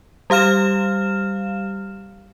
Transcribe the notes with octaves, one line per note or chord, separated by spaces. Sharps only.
G3 G4 F5 F6 E7